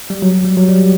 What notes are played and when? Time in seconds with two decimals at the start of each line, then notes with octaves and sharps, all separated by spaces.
0.10 G3
0.22 F#3
0.45 G3
0.57 F#3
0.69 G3